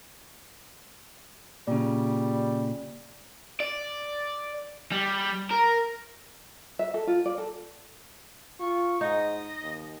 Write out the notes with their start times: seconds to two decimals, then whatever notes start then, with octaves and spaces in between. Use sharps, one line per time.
1.68 A#2 C#3 G3
3.60 D5
4.92 G3
5.51 A#4
6.79 E5
6.94 A4
7.07 F4
7.26 D5
7.38 A4
8.60 F4 C#6
9.01 G#2 D#4 D#5
9.63 D#2